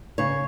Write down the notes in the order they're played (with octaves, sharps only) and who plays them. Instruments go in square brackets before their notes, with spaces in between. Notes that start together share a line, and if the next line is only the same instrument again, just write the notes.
[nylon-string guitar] C#3 C#5